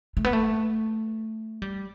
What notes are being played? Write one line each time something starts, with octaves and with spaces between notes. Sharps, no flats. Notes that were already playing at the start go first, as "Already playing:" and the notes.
A3
B3
A3
G3